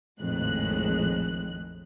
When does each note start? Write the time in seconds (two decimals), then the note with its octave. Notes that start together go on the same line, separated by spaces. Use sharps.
0.21 A#1 F2 A2 D#3 G#3 F#6